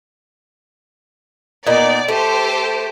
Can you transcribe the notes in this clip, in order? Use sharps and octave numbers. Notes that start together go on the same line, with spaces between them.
A#2 B3 D#4 D5
A3 G4 A4 C5